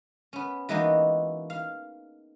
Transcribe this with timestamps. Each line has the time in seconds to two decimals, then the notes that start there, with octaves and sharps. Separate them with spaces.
0.33 B3 C#4
0.69 E3 G#3 A#3 B3 D#4 F#4
1.50 F5